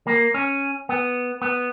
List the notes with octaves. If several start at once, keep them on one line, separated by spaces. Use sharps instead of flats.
A#3
C#4
B3
B3